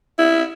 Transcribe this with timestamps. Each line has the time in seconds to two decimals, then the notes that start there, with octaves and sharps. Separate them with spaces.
0.18 E4